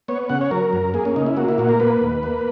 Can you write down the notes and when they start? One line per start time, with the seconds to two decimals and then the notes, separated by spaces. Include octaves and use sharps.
0.08 B3 C#5
0.29 C#3 F#5
0.41 C#5
0.51 F#3 A#4
0.73 F#2
0.94 A#3 G#4
1.05 C#4
1.16 C#3 D#4
1.26 E4
1.37 A#3 F#4
1.48 E4
1.58 A#2 F#4
1.69 A#4
1.80 A#3 B4
2.02 D#2
2.23 A#3